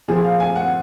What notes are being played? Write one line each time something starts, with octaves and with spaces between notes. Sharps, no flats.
A#2 F3 G#4
F5
G#5
F#5